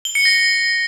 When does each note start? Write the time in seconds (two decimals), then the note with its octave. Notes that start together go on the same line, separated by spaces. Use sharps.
0.05 G7
0.15 C#7
0.25 A#6